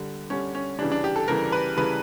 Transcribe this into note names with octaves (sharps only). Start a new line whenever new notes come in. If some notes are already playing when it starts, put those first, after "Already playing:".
Already playing: D3 G3
D3 G3 C#4
C#4
C#3 E3 G3 D4
D4
G4
A4
C#3 E3 G3 A#4
B4
C#3 E3 G3 B4